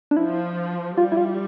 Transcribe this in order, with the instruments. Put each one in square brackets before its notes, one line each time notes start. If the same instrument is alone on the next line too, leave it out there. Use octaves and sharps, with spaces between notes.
[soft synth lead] D4
[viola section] F3 [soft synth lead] E4
[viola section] G3 [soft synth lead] F4
[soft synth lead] E4
F4